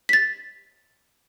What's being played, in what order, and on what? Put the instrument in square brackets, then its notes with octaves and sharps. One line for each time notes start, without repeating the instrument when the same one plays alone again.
[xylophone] A6 B6